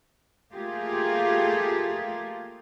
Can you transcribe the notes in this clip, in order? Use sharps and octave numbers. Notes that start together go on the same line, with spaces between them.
A3 A#3 F4 G4 G#4